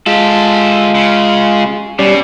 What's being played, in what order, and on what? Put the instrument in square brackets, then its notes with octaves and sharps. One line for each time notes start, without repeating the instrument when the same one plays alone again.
[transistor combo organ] G#3 F4 [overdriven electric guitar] G4 A4
[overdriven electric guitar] C#3
[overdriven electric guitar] B2 [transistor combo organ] G3 C#4 D5